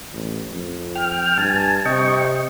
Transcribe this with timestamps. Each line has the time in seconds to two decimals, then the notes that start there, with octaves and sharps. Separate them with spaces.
0.14 A1
0.52 F2
0.95 G5 F6
1.38 G2 G#5 A5
1.85 C3 D#5 G5 C#6